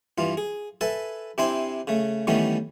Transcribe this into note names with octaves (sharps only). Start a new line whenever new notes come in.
G2 E3 F4
G#4
A4 B4 E5 G#5 A5
C3 C4 D4 E4 C5 G#5
C#3 A3
D#3 E3 G3 A3 B3 C#4